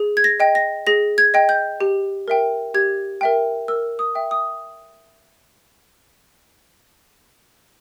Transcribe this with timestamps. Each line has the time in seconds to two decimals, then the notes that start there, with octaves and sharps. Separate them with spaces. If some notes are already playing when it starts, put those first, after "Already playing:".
Already playing: G#4
0.17 G#6
0.24 A#6
0.40 D#5 G5
0.55 A#6
0.87 G#4 A#6
1.18 G#6
1.34 D#5 G5
1.49 G6
1.81 G4
2.28 A#4 E5 G5
2.74 G4 G#6
3.21 A#4 E5 G5
3.68 A#4 E6
3.99 D#6
4.15 E5 G5
4.31 D#6